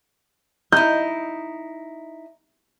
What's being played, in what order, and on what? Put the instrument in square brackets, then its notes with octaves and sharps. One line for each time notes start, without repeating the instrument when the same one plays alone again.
[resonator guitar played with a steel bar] D#4 E4 [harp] G6